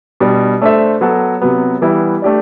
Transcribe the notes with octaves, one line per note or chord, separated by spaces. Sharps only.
B2 G3 D4
A3 D4 A4 C5 E5
F#3 B3 F#4 A4
C3 F#3 B3
E3 G3 B3 E4
A3 D4 G4 D5